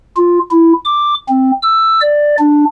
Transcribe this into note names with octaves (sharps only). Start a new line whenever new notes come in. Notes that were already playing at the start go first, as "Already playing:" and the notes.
F4
E4
D6
C4
E6
D5
D4